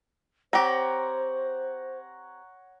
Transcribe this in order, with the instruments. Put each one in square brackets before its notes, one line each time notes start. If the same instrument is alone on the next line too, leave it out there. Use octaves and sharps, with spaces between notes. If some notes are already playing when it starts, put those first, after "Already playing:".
[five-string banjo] C4 G4 [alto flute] C5 [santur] C#5 F#5 A#5